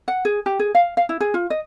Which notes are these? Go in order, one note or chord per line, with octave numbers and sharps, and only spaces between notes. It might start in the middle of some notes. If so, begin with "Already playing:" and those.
F#5
G#4
G4
G#4
F5
F5
E4
G#4
F4
D#5